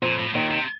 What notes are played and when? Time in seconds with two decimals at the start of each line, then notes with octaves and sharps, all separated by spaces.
0.02 F2 A#2 F3
0.19 A2
0.34 D#2 A#2 D#3
0.51 C3